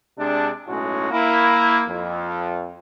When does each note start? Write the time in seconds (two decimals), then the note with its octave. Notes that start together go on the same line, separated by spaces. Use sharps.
0.19 C3 G#3 D4
0.68 B1 A2 G#3 C#4 F#4
1.11 A#3 E4
1.88 F2